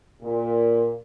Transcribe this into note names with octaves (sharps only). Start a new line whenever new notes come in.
A#2